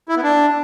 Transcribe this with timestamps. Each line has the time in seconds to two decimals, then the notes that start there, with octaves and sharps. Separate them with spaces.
0.09 E4
0.16 B3
0.24 D4